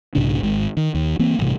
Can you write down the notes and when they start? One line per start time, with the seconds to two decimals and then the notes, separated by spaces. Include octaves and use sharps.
0.15 B1 G#2 C#3 D4
0.43 G#1 G#2
0.77 D#3
0.94 D#2
1.19 E3 A#3 C4
1.39 A1 G2 C3